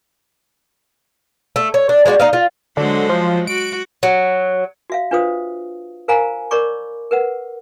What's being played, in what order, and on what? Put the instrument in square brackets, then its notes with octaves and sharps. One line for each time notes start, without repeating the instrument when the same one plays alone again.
[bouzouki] A3
C#5
D4
G#3 D4 F4 F#4
D#4 D#5 F5
F4
[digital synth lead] D3 [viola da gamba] F#3 G#3 C5
[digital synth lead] F3
[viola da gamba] F#4 [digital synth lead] D7
[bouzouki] F#3
[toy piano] F#4 E5 F5
D4 F4 B4 C5 F5 D#6
A#4 C5 F5 G#5 A#5 B5
A#4 C#5 D5 B5 C#6 D6
A#4 B4 F#5